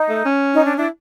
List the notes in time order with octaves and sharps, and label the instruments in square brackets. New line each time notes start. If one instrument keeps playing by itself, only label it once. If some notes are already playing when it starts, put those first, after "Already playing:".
Already playing: [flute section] D#4
[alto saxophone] A3
C#4
[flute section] D#4
D4
[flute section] D4 [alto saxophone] E4